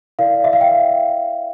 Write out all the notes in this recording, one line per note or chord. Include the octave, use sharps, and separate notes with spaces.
E4 A#4 D5 F5
E5
F5
G5